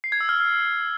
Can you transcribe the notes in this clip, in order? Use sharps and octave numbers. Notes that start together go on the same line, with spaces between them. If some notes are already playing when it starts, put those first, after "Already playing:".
C7
G#6
E6
F6